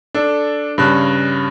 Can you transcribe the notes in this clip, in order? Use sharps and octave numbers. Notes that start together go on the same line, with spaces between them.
D4 A4
G2 C#3 F#6